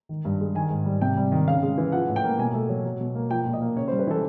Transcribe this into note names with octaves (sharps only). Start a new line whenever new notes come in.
D#3
G2
G#3
D#3 G#5
G#2
G3
C3 G5
G3
D#3
C#3 F5
G#3
E3
F3 F#5
A2
G5
A#3
B2 G#5
A3
F#3
F#3
B2
A#3
F3 G5
A#2
D#5
A#3
C#3 C#5
C5
G3
B4
E3 A4